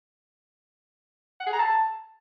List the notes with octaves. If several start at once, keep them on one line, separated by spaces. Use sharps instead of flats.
F#5
G#4
A#5
A5